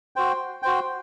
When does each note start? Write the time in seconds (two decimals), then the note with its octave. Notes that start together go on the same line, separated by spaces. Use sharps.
0.16 F#4 C5 G5
0.63 F#4 C5 G5